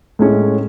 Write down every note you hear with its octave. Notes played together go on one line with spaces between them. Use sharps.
A2 G#3 C#4